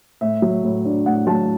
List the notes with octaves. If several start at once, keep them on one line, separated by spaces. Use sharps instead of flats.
A2 E5
F#3
A2
D4
A2 F#5
F#3 A5